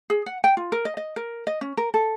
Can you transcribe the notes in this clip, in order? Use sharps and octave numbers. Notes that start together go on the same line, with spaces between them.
G#4
F#5
G5
F4
A#4
D#5
D#5
A#4
D#5
C#4
A#4
A4